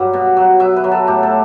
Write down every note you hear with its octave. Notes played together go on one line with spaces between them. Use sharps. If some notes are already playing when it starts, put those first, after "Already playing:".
Already playing: G2 F#3
B2
F#3
F#3 E5
B4
F#3
A4
A2 G4
A4